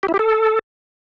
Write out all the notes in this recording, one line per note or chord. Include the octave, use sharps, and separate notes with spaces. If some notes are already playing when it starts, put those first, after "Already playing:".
G4
E4
G4
A4